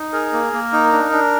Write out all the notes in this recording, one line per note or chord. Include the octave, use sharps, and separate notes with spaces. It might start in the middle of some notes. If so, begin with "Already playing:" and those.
Already playing: D#4
G#4 A#4
A#3
A#3
D#4
D4
D4